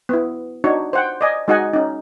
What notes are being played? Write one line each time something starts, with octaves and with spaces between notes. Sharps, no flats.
B3 E4
D4 D#4 F#4 C#5
C5 F#5 G5
D5 D#5 G#5
G#3 D#4 F#4 D#5 F#5 G#5
C#4 D#4